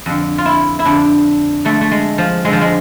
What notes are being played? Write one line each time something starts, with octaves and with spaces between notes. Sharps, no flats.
F2 D3
F4
E4
E4
F2 D3 D4
F2 D3 A3
A3
G#3
F3
F2 D3 G#3
F3
G#3